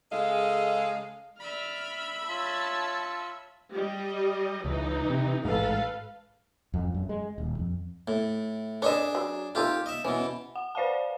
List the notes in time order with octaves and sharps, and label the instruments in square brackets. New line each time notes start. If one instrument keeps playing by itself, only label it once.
[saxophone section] C#3 G#3 G#4 A4 D#5 F5
[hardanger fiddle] D5 [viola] E5 B5 [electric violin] F6
[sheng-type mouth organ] F4 E6 [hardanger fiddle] C#5 [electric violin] A5
[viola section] G3 D#5
[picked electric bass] C#2 [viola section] E3 D#4
[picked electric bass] C3
[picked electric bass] A1 G#2 [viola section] A4 B4 F5
[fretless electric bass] F2
F#2
G#3
D#1
F2
[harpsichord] A2
[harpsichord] D4 G#4 E5 [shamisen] C#5 D#5
[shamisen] F#3
[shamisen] A3 D#4 [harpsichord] F4 G4
[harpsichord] D#5 E5
[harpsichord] B2 E3 [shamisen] C#4
[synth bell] F#5
B4 C5 D5 F5 F#5 A5